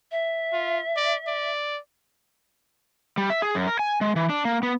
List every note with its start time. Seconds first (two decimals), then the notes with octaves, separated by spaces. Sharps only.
0.12 E5
0.53 F4
0.97 D5
1.27 D5
3.18 G3
3.30 E5
3.42 G#4
3.55 F#2
3.67 A#4
3.79 G#5
4.01 G#3
4.16 E3
4.29 D4
4.45 A#3
4.63 B3